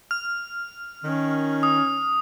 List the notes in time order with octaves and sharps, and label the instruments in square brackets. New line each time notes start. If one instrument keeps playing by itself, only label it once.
[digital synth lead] F6
[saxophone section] D#3 [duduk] C#4
[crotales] D#6